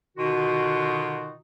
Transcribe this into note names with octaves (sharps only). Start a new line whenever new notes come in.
B2 D3 D#3 D#4 F4 F#4